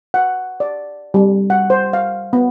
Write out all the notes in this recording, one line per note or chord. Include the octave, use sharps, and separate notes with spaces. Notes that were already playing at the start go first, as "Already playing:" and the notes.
F#5
D5
G3
F#5
C5
F5
B3